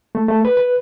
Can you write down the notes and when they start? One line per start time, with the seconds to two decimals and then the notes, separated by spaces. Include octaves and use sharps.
0.15 A3
0.29 A3
0.45 B4
0.57 B4